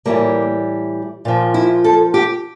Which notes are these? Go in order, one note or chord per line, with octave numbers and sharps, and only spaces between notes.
A2 E3 G3 A#3
A#2 F3
E4
A4
G4